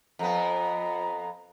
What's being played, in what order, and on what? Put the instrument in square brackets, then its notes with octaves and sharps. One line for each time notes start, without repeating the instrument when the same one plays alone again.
[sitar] F2 B3 [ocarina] A#5